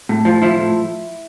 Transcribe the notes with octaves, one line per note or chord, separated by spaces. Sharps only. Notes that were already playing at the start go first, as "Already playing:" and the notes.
A2
F3
F3 E4
A2